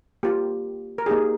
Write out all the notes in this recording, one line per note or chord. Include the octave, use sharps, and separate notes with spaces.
A#3 F4 G4
A#4
A#3 D#4 G4 G#4